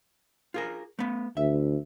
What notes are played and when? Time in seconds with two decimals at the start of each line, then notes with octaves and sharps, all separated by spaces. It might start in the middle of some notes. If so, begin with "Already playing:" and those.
0.54 F4 G#4 A#4
0.99 A3 B3
1.37 D2 E5